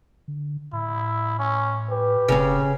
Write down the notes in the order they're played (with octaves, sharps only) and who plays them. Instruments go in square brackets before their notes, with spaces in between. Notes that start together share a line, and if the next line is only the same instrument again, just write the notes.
[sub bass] D3
[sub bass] A2 [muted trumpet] E4
[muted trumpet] C#4
[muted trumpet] G4 [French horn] B4
[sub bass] F1 [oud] C#3 C#4